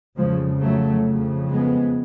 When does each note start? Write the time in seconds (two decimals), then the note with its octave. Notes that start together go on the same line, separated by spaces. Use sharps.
0.17 F2 C#3 F3 G#3
0.61 F#3 A3
1.06 F2 C#3
1.49 G#3 B3